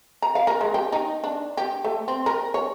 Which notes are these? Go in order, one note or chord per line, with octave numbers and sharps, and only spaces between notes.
A#5
F5
A#4
G#3
G4
D#4
D4
G4
A3
C4
A#4
C#5